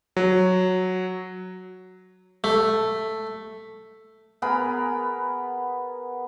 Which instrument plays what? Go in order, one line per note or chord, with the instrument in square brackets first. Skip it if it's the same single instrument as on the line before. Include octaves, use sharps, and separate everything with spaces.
[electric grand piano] F#3
[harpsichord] A3
[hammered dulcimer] B3 G#4 A#4 B5